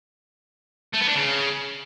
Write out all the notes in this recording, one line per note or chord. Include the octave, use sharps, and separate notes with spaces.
A3
B3
D4
C#3